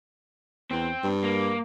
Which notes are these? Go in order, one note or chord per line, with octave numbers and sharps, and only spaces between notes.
E2 C4
G2
A#3